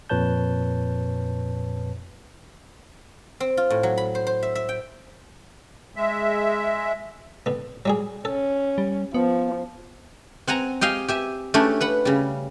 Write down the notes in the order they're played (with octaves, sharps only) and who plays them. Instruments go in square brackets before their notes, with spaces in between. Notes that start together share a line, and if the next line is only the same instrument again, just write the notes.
[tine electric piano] F2 A#2 B4 C#5 A5 G6
[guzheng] C4
F4
A2
F#3
B5
C5
C5
E5
E5
G5
[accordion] G#3 E5
[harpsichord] D3 B3
F#3 G3 G#4
[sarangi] C#4 [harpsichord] A4
[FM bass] G3
[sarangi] F3 [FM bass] B3
[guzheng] C4 F#5 G#5 A#5
G4 D#5 F5 G5 G#5
G4 E5 G#5
A3 C#4 D4 E4 G4
B4 F#5 B5
C#3 G3